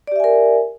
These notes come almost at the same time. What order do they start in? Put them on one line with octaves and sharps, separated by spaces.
D5 G4 E5 G#5 A#4